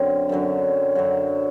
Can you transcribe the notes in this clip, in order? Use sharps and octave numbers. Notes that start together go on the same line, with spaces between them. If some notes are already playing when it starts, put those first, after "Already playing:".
Already playing: F#2 D3 F#3 C4
F#2 D3 F#3
F#2 D3 F#3